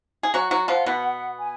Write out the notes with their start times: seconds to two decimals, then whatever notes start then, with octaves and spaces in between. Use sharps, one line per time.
0.23 G#4
0.33 F#3 F#4 F#5
0.51 F#3 F#4
0.68 F3 F4
0.86 B2 B3
1.39 G#5